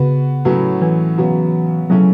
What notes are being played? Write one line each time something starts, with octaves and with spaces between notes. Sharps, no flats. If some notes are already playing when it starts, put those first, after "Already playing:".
Already playing: C#3 B3 F#4 B4
A2 F#3 C#4 F#4 B4
E3
C#3 F#3 B3 F#4
C#3 E3 F#3 A3 C#4